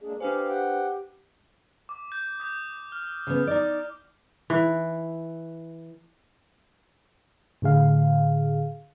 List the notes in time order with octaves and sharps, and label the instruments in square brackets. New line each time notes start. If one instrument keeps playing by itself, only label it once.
[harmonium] G#3 A#3 D4 [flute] G#4
[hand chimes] D4 B4 C5 [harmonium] G4 F5 [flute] G#5
[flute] G4 [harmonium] F#5 G5
[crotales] D6
G6
D#6 G6
F6
[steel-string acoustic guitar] C#3 B3
D#4 D5
[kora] E3
[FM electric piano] A2 D3 G#4 F5